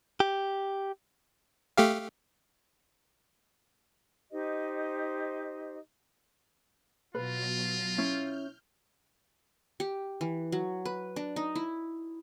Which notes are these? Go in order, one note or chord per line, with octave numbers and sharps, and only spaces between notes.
G4
A3 G4 F5
D#4 G4 C5 D#5
B2 F#3 F4 B4 A#6
C#4 E4 F6 G6
G4
E3
F#3
B4
D4
D#4
E4